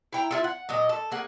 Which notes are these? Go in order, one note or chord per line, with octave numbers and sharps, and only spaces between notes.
E4 G5 A#5
E4 F4 A4
F#5
A#2 F#3 D#5
A4
A#3 G#4 F#5